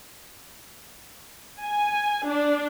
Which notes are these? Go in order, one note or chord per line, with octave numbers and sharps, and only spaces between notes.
G#5
D4